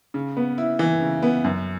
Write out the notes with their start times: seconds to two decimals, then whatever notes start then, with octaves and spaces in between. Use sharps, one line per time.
0.14 C#3
0.37 B3
0.58 E4
0.79 E3
1.01 C#3
1.22 B3
1.44 F#2